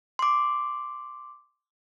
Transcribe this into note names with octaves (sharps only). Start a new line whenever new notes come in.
C6 D6